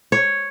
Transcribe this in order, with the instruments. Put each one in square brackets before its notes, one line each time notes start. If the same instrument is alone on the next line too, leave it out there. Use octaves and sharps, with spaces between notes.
[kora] C#5